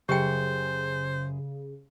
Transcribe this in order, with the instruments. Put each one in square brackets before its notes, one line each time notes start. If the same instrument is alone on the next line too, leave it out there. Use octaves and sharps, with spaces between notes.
[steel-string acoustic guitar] F#2 G#4 [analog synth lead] C#3 [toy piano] G4 G5 [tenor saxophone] C5